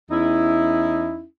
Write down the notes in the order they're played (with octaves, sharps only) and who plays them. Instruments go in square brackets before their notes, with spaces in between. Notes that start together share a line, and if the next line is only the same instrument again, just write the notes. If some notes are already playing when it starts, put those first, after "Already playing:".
[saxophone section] E2 C#4 D#4 E4